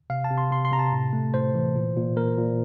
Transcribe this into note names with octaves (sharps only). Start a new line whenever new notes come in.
C3 F5
A5
C3
C6
C3 C6
C6
C3 A#5
A5
A2
A3
A2 C5
E3
A#2
A#2
A#3 A#4
A#2